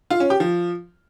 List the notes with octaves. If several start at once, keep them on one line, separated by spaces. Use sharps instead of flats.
F4
C#4
G4
F3